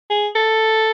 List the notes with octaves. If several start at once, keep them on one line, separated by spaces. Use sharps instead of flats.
G#4
A4